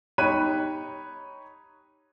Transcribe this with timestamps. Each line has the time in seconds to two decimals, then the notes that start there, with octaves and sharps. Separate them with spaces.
0.18 D#4 G4 C#5 B5 F#6 D#7